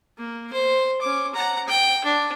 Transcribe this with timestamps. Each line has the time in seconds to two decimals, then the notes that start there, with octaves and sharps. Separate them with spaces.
0.18 A#3
0.53 C5
1.01 C#4 D6
1.35 F#5 A#5
1.68 G5
2.04 D4